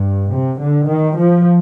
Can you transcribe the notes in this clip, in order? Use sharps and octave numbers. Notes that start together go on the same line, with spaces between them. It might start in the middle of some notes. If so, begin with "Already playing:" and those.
Already playing: G2
C3
D3
D#3
F3